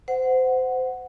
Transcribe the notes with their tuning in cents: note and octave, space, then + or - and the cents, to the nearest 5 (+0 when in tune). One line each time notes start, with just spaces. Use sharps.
C5 -25 F#5 +0